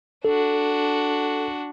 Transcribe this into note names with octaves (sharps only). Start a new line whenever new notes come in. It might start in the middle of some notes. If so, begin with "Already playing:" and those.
D4 F#4 A4